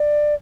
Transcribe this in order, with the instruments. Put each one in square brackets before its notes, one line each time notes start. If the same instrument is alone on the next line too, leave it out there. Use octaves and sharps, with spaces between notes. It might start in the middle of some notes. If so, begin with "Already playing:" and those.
Already playing: [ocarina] D5